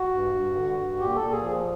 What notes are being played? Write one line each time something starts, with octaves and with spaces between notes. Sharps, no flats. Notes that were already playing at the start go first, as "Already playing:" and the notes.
Already playing: F#4
G2
G2
D3
G2
A#2 G4
A4
A#2
G#4
F3